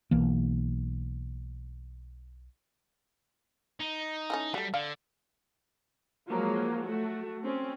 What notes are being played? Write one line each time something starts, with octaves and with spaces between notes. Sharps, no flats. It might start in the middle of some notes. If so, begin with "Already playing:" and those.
B1 E3 A#3
D#4
E3 A3 C#4
F#3 G3 A3
D3 F5
F3 F#3 G#3 A#3
A3 F#4
C4 C#4